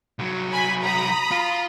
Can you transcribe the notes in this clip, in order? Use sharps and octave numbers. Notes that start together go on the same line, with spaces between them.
C2 F#3
G#5 B5
A#5 B5 D#6
F4